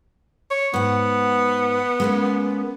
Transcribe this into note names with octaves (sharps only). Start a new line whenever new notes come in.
C#5
G#2 B3 F#5
G#3 A#3 C#4